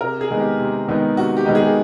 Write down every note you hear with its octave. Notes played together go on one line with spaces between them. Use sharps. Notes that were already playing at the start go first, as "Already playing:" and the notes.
C3 A#4
G#4
D#3 G#3 B3 D#4
G4
C3
D#3 G#3 B3 D#4
C3 F#4
G4
D#3 G#3 B3 D#4
G#4